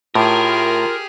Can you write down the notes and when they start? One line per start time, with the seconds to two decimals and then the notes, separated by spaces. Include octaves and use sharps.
0.15 A2 F4 G4 G#4 A#4